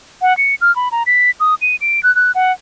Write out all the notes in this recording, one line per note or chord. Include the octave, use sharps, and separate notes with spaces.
F#5
C#7
F6
B5
A#5
B6
D#6
D#7
D7
F#6
F#6
F#5